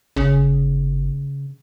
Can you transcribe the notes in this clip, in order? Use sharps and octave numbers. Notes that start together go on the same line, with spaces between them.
G1 C#3